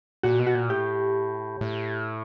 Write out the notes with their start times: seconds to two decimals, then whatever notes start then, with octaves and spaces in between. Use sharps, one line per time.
0.23 A#2 F#4
0.39 B2
0.47 F#4
0.55 A#2
0.69 A2 G4
1.61 A2